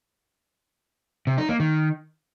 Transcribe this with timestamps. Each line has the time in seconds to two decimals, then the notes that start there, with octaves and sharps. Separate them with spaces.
1.27 C3
1.38 D#4
1.49 A#3
1.60 D#3